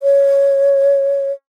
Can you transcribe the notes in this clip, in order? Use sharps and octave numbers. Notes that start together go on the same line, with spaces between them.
C#5